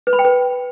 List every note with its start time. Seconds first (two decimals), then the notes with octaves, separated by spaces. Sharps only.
0.07 B4
0.13 B5
0.19 G5
0.25 B4